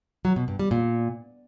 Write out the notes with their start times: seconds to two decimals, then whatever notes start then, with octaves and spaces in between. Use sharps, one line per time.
0.25 F#3
0.36 B2
0.48 G2
0.59 G3
0.71 A#2